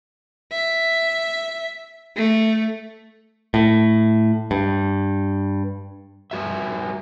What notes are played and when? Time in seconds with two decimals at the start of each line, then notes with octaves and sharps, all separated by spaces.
0.51 E5
2.16 A3
3.54 A2
4.51 G2
6.31 G3 F#4 E5